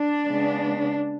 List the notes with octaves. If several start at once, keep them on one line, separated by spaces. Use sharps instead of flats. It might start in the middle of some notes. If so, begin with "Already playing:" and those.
Already playing: D4
C#3 G#3 B3